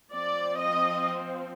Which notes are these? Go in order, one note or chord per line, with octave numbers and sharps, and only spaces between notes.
F3 C4 D5
D#5